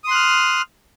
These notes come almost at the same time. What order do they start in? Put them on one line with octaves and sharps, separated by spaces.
D#6 C6 F#6 F6